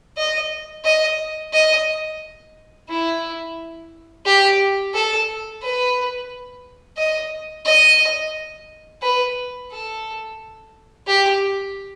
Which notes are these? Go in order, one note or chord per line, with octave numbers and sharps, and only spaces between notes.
D#5
D#5
D#5
E4
G4
A4
B4
D#5
D#5
B4
A4
G4